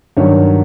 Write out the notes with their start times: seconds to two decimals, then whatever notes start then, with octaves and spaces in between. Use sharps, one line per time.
0.17 G2 D#3 F#3 C#5